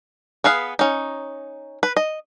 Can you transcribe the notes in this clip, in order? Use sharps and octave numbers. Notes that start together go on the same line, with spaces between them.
B3 G#4 B4 F5
C#4 D#4
B4
D#5